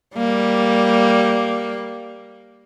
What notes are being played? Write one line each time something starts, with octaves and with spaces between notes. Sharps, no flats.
G3 A#3